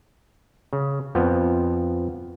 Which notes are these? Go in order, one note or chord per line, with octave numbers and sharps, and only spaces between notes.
C#3
F2 F3 B3